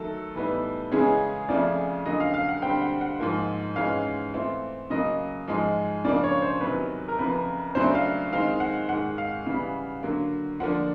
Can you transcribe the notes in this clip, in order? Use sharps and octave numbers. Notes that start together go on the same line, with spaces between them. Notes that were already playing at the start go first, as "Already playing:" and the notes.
Already playing: D#3 F#3 A3 A4
A2 E3 G3 B3 D#4
C#3 E3 G#3 C#4 G#4
F2 C#3 F3 A3 D5
D3 F#3 A#3 C#4 D#5
F5
F5
F#5
D3 G3 C4 G5
F#5
F#5
G#2 F3 A#3
G#2 E3 G#3 C#4 F5
E3 A3 C4 F4
C#3 F#3 A#3 D#5
G#2 F3 G#3
C#3 F3 A#3 D4 D5
C#5
C5
E2 C3 D#3 F#3 B4
A#4
F2 C#3 F3 B4
F#2 C#3 F#3 A3 D4 C5
F5
D#3 G#3 C4 D#4 F5
F#5
G#2 D#3 G#3 F#5
F5
C#3 E3 G3
D3 F#3 A#3
D3 F3 A#3 D4 F#5